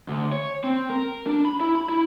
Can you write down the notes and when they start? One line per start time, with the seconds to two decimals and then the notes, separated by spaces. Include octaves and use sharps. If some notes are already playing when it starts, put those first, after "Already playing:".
0.08 D2
0.32 C#5
0.64 C4
0.90 A#4
1.27 D4
1.45 B5
1.60 E4
1.75 B5
1.89 E4